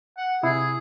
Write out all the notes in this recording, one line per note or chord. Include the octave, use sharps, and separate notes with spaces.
F#5
C3 E4 G#4